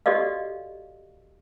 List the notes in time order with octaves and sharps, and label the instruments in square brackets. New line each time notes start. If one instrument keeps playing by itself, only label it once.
[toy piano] F#4 G4 A4 D5 D#5 F5